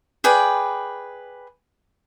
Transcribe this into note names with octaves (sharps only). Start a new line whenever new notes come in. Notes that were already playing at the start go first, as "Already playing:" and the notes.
G#4 B4 D5 G5